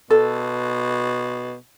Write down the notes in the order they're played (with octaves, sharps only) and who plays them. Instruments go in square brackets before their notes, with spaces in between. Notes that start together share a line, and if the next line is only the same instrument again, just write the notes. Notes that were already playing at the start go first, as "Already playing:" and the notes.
[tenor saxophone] B2 [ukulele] A4